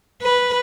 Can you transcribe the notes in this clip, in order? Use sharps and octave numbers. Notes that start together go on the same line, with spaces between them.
B4